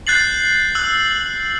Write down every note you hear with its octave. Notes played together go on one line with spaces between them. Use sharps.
F#6 G6 A6 C7 F#7
E6 F#6 F#7